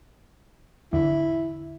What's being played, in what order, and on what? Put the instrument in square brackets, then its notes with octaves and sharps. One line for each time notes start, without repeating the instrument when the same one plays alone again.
[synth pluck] G#1 E2 D3 [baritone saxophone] E4